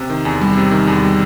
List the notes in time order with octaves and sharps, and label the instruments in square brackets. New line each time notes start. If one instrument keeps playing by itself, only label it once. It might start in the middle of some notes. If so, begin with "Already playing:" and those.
Already playing: [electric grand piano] C3
D#3
E2
G3
C3
D#3
E2
G3